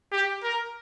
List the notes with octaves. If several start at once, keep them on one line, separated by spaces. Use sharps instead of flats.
G4
A#4